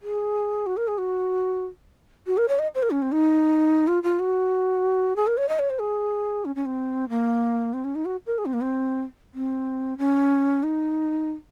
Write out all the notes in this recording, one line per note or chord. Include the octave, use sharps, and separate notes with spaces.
G#4
F#4
A#4
G#4
F#4
F#4
A#4
C#5
D#5
C5
A#4
C#4
C4
D#4
F4
F4
F#4
G#4
A#4
C#5
D#5
C#5
C5
G#4
C#4
C#4
C4
A#3
C4
C#4
D#4
F#4
A#4
G#4
C4
A#3
C4
C4
C#4
D#4